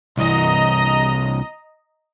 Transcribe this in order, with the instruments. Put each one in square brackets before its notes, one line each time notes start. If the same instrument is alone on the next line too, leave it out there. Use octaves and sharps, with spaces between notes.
[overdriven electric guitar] C2 E3 [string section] D#5 A#5